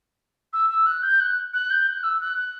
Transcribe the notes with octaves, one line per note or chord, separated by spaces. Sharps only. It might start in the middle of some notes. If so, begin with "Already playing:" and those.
E6
E6
F#6
G6
F#6
F#6
G6
F#6
E6
F#6
F#6